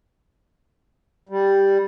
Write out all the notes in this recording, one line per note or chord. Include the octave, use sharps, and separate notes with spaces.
G3